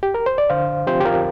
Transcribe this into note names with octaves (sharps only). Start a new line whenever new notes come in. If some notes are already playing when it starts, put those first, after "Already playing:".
G4
A#4
C5
D5
D3 C5 F5
F3 C4 F4 G4 C5
G4
F4 A#4